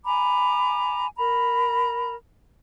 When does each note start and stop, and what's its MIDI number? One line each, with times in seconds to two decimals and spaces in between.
0.05 1.07 80
0.05 1.07 82
0.05 1.07 83
0.05 1.07 86
1.17 2.15 70
1.17 2.15 82
1.17 2.15 83